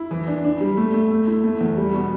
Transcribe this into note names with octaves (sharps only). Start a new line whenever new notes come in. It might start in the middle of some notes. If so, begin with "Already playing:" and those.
Already playing: E4
E3
D4
D4
G3
A3
A3
A3
E4
A3
E2
G3
B2